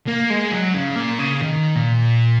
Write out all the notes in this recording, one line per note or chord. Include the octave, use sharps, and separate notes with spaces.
A#3
G#3
F#3
C#3
A#2
C#3
D#3
A#2